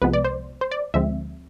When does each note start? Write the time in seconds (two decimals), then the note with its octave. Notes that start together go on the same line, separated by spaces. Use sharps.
0.02 C2 C3 F3 G#3 B3 B4
0.13 D5
0.25 C5
0.61 C5
0.71 D5
0.94 D2 D3 F3 G#3 C4 E5